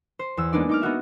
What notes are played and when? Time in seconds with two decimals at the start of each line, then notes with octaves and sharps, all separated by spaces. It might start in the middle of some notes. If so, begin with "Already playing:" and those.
0.19 C5
0.37 E2 E6
0.53 G#3 A#3 B3 D4 D#4 D5
0.69 D#4 D6 F6
0.82 B3 D#4 F#4 E5